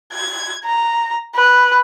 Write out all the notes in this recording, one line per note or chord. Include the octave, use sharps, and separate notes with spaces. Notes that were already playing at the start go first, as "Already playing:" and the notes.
G#6
A#5
B4